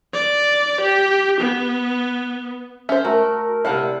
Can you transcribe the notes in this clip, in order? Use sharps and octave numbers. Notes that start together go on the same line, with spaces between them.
D5
G4
B3
C#4 C5 E5
A3 F#4 A#4
C3 D4 E4 F5 F#5 A5